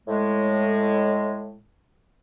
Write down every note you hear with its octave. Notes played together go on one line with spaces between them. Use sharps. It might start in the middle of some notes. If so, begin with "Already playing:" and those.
A2 G#3